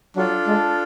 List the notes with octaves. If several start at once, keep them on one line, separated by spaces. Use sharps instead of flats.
F#3 D4 F4 A4
G#3